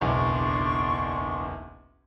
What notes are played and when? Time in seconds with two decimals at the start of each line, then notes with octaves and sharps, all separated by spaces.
0.01 F#1 B1 E2 D4 C6 C#6